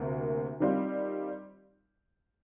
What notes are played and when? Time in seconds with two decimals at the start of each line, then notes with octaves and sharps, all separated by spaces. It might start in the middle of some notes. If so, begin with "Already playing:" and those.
Already playing: D2 C3 A#3
0.60 D#3 G3 C4 F4